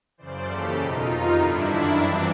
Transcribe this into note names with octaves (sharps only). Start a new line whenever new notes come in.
F#2 C#3 E3 C5 D5
D#2 C#3 E3 G4 A4
E2 B2 D#4 F4
F2 C3 D#3
G2 D3 D4 E4
F#2 D#3
G2 E3 C4 D4